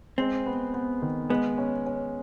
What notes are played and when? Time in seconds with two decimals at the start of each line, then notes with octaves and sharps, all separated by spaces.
0.18 G#3 C4
0.46 B3
0.74 B3
1.02 D#3
1.30 G#3 B3
1.58 C#4
1.86 C#4